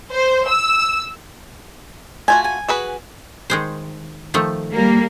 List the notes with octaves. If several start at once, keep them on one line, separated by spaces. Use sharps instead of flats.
C5
E6
A3 F4 F#4 G#5
G#5
F#4 G#4 B4
D#3 G#3 C5
D#3 F3 A3
G3 A#3